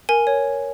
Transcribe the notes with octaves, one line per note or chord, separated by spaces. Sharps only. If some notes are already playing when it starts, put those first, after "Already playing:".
A#4 G#5
C#5